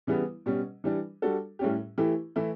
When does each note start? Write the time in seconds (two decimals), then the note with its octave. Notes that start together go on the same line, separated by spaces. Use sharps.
0.07 C#3 E3 G3 B3 E4
0.46 B2 G3 C#4
0.84 E3 G3 D4
1.22 G3 D4 F#4 A4
1.59 A2 G3 C#4 G4
1.98 E3 A3 E4 G4
2.36 E3 A3 E4